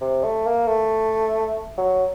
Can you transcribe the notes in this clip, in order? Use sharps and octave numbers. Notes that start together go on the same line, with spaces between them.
C3
A3
A#3
A3
F#3